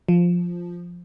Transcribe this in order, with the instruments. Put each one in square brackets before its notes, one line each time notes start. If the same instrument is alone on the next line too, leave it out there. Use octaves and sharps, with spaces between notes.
[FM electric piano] F3